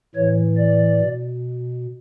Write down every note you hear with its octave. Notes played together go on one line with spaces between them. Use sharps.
A2 E3 C#5
D5
B2